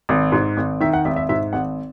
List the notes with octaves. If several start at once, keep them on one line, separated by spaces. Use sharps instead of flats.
G#1
G#2
G#1
D#3 E5
F#5
G#1 E5
E5
G#2 E5
G#1 F#5